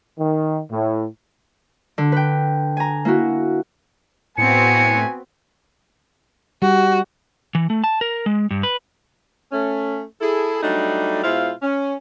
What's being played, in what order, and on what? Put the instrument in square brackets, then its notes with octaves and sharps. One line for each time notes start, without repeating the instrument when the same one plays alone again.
[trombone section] D#3
A2
[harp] D3
B4 G5
G#5 A#5
A#3 E4 F#4
[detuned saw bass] A2 [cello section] B3 C4 F#4 [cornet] G#5 [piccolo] C#7
[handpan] G3 [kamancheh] F#4
[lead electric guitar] E3
A3
A5
A#4
G#3
G2
B4
[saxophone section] A3 C#4
E4 G#4 A4
F#3 G3 A3 D4 D#4
B2 G#3 E4 F4 C5 F5
C#4